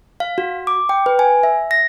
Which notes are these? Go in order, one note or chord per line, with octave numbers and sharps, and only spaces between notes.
F5
F#4
D6
G5
B4
G#5
E5
A#6